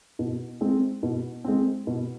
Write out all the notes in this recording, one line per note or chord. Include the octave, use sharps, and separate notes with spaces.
B2
G#3 C4
B2
G#3 C4
B2